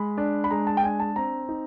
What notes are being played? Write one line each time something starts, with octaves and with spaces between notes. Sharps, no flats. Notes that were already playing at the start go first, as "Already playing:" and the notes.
Already playing: G#3 B5
D4
B5
G#3 A#5
A5
G5
D4 G#5
A5
C4 A#5
D#4